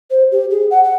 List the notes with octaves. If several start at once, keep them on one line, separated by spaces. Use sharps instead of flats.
C5
G4
G#4
F#5
F#5